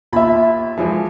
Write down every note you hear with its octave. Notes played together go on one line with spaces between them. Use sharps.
D#2 F4 E5 B5
E3 F3 G#3